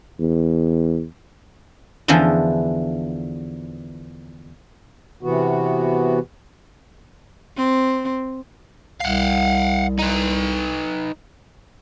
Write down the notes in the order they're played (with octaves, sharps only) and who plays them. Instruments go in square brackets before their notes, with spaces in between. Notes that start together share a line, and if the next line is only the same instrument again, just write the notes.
[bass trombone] E2
[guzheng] E2 D3 E3 F3
[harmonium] C3 E3 B3 F#4
[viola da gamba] C4
[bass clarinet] C2 [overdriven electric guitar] F5 F#5
[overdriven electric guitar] D#4 B4